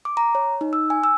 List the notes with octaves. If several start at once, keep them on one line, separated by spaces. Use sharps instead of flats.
D6
A#5
C#5
D#4
E6
G#5
E6